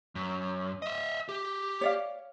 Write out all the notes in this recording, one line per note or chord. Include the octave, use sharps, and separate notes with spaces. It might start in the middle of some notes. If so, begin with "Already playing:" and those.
F#2
D#5 E5
G4
C#5 D5 F5